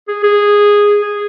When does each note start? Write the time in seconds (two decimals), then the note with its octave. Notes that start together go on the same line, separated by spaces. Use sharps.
0.08 G#4
0.24 G#4
1.02 G#4